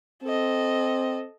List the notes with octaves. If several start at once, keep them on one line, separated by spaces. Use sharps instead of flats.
C4 A4 D#5